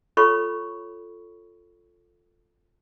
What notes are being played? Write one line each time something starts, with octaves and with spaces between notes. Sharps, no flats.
F4 A4 C#5 B5 C#6